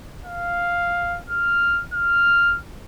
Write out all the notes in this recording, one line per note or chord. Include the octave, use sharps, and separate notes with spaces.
F5
F6
F6